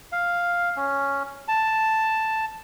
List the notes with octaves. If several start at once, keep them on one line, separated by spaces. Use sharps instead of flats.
F5
C#4
A5